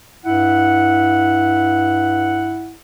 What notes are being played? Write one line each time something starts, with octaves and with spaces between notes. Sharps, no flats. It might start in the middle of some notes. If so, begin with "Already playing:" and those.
G2 E4 F#5